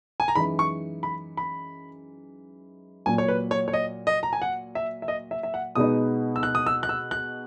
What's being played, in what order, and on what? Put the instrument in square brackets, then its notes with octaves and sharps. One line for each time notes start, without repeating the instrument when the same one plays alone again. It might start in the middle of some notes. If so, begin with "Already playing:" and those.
[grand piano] G#5
A#5
[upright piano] F#2 E3 G#3 D#4 [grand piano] B5
[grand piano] C#6
B5
B5
[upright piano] A#2 F#3 A#3 [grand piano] G#5
[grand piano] C#5
B4
C#5
C#5
D#5
D#5
A#5
G#5
F#5
E5
E5
D#5
E5
E5
F#5
[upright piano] B2 G#3 B3 D#4 [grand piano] D#6
[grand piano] E6
F#6
D#6
E6
F#6
E6
F#6